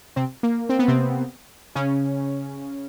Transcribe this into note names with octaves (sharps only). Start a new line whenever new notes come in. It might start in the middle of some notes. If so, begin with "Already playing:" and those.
C3 C4
A#3
C4
B3
C3 C4
C#3 C#4